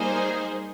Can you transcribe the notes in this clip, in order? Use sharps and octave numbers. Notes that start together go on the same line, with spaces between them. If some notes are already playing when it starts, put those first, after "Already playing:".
Already playing: G3 A#3 D#4 G#4 C5